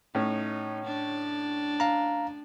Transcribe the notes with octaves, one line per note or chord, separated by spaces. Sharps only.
A2 C#4 D#4
D4
F5 A#5